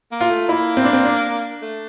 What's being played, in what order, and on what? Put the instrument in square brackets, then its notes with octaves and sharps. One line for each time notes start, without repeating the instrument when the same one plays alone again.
[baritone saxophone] A#3
[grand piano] F4
[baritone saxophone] A3
[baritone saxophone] A#3 [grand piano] E4
[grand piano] C4
D4
C4
D4
[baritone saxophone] A3